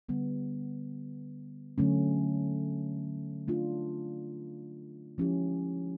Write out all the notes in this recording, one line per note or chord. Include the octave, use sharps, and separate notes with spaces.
D3 G3 B3
D3 F#3 A3 C#4
A3 D4 F4
F3 G#3 C#4 E4 G4